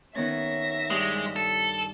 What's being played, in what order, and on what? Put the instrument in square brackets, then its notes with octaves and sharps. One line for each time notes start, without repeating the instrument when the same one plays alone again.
[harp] D#3 B3 C#4 [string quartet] E5 A#6
[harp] G2 D#6 [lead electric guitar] G#3
[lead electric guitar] A4